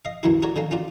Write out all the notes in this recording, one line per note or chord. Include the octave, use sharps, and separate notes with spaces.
D#5 F5
C2 F#2 D#3 E3 E4 F#4
F#4 A#4 C#5 D5
D3 D#3 A#3 C#4
C#4 F4 F#4 D5